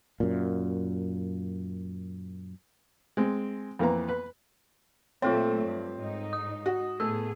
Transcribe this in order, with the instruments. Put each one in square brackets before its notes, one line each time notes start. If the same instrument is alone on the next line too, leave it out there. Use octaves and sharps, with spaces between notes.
[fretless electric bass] F#2 A#2
[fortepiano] G#3 C4
F2 E3 A#3 B3 A#5
B4
[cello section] A#2 F#3 A3 [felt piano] C4 [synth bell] F4 A4 C#5
[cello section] G2
G#2 D#4
[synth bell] D#6
[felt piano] F#4
[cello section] A2 B3 G#4 [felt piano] A3 [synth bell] E6